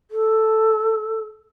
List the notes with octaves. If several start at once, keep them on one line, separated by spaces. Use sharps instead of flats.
A4